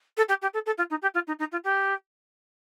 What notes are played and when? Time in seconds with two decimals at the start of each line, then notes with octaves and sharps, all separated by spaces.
0.17 A4
0.28 G4
0.42 G4
0.53 A4
0.66 A4
0.78 F4
0.90 D#4
1.02 G4
1.14 F4
1.27 D#4
1.39 D#4
1.52 F4
1.64 G4